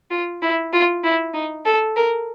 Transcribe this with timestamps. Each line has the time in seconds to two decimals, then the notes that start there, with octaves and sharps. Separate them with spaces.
0.11 F4
0.42 E4
0.73 F4
1.04 E4
1.34 D#4
1.66 A4
1.96 A#4